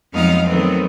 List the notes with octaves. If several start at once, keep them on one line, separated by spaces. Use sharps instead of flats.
F2 F#3 G#3 B3 D#4 F5
D#3 F#3 A3 B3 C4